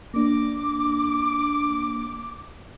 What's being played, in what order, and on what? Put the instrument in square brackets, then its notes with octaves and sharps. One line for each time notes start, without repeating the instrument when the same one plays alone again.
[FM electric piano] A#3 D4 [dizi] D6